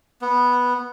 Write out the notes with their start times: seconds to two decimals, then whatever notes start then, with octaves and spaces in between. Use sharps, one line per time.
0.21 B3